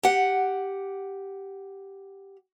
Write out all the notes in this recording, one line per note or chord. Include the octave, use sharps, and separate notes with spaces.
G4 F#5